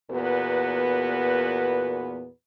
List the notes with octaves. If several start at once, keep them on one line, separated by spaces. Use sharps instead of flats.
E2 A#2 B3 F#4 A#4 B4